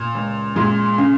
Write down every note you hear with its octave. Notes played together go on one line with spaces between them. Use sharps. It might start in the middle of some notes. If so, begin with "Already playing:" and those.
Already playing: A#2
C#2
A#2 G#3
C#3